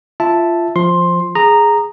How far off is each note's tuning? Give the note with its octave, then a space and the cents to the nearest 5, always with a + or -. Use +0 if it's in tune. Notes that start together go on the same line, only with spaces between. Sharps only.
F4 -20 E5 +0 A5 +0
F3 +0 C6 +10
G#4 +0 A#5 -5 D#6 -25